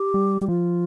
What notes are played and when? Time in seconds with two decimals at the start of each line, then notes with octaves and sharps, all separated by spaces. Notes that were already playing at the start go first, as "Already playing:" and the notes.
Already playing: G4
0.14 G3
0.41 G3 G4
0.48 F3 F4